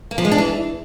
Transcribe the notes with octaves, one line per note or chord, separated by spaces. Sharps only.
A#3
F3
G#3
D4
E3